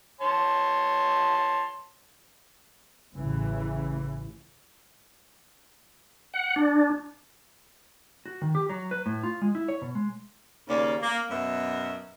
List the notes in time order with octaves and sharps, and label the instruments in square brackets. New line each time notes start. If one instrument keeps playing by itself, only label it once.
[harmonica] C#5 A5 C6
[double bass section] A1 C#3 E3
[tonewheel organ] F#5
D4
[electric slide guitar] F#4
D#3
G4
F#3
B4
A2
F4
G#3
E4
C#5
B2
G#3
[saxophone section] D#2 C#3 A#3 C#4 D5
A#3
F#2 B2 B3 A#4 E5